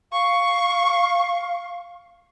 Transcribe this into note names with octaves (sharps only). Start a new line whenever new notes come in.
F5 C#6